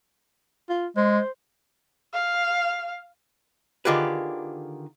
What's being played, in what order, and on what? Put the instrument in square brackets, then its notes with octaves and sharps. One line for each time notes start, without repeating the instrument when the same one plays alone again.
[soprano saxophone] F4
[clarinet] G#3 [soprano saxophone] C5
[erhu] F5
[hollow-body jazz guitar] D3 D#3 F4 G4 G#4 B4